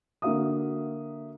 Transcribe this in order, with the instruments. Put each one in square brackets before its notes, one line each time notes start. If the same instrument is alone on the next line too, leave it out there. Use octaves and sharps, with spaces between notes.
[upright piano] D3 A#3 F#4 E5 F5 D#6